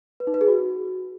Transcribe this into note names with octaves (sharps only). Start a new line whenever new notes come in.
B4
D#4
B4
G#4
F#4